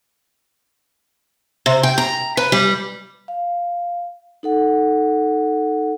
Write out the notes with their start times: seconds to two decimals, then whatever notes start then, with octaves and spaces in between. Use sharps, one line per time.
1.66 C3
1.83 G5
1.98 A#5
2.37 B4
2.52 G3
3.28 F5
4.43 D#4 A4 F#5